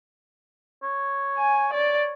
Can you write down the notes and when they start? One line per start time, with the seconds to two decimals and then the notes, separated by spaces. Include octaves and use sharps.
0.83 C#5
1.38 G#5
1.74 C#5 D5